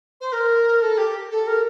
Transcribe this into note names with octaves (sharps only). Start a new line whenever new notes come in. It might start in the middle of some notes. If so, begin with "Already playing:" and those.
C5
A#4
A4
G4
A4
A#4